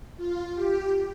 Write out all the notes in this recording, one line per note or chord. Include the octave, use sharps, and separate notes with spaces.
F4
G4